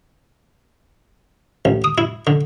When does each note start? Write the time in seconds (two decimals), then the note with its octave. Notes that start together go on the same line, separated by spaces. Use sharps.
1.65 A1
1.84 D#6
1.98 E4
2.27 D3